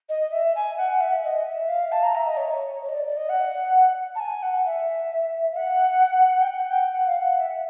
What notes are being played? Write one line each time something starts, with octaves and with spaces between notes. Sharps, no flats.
D#5
E5
G#5
F#5
E5
D#5
E5
F5
A5
A#5
E5
D#5
C#5
C#5
D#5
D5
D5
D#5
F#5
A5
G#5
F#5
E5
F5
F#5
G5
F#5
G5
F#5
F5
F#5
E5